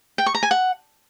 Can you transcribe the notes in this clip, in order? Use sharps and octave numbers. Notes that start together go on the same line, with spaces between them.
G5
C#6
A#5
G#5
F#5